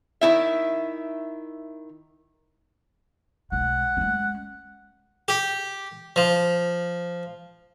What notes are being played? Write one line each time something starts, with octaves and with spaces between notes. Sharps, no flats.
D#3 E4 E5
B1 G#3 F#5
G#3 C#4
G4
F3